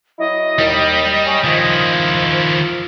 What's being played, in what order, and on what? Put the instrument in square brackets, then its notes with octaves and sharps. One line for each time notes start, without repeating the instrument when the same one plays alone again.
[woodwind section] F#3 E4 [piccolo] D#5
[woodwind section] D#2 [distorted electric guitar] G3
[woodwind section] C#5 G#5
[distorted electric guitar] D#3 E4 [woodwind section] F3